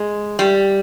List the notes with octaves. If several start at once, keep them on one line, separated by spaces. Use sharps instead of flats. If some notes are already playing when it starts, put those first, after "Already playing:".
Already playing: G#3
G3